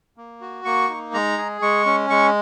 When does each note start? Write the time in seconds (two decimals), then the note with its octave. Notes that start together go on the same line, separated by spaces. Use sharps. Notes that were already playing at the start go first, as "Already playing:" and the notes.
0.17 A#3
0.41 F#4
0.65 A#3 C#6
0.89 D#4
1.13 G#3 A#5
1.38 G#4
1.62 G#3 C#6
1.86 C#4
2.10 G#3 C#6